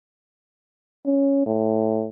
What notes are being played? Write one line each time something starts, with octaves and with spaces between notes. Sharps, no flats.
C#4
A2